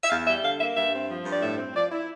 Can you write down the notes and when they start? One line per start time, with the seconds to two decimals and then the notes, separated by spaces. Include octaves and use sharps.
0.04 E5
0.10 E2 F5
0.27 G3 E5
0.44 D3 F5
0.60 A#3 E5
0.76 G2 E5
0.93 C4
1.09 F3
1.25 G2
1.33 D5
1.42 A2 E5
1.58 C4
1.75 F3 D5
1.92 E4